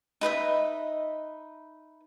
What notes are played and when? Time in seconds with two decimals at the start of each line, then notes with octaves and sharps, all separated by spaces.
0.21 D#4 B4 D#5 E5